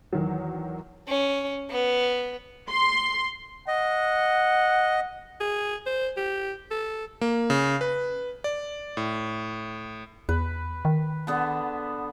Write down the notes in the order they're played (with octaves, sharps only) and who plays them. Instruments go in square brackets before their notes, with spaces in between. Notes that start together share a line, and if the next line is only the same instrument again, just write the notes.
[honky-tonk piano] E2 D#3 F#3
[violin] C#4
B3
[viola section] C6
[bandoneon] D#5 [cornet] F#5
[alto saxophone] G#4
C5
G4
A4
[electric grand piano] A#3
C#3
B4
D5
A2
[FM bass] E2 [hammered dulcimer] B4
[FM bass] D#3
[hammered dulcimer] D3 B3 A4